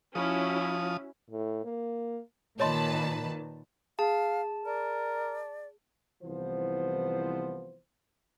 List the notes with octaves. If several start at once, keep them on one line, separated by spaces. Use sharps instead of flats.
F3 C#4 E4 F#4 D#6
A2
A#3
A#2 D#3 B4 C#5 D#5 A5 C6
G#4 F5 A5
A#4 D5
C2 E3 F3 B3 C5